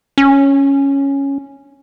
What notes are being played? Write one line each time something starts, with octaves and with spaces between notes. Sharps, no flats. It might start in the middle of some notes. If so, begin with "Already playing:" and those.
C#4